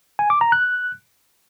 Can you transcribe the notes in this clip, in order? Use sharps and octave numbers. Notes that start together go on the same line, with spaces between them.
G#5
D6
A#5
F#6